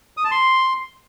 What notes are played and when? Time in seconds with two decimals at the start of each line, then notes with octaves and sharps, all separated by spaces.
0.17 D#6
0.24 A5
0.31 C6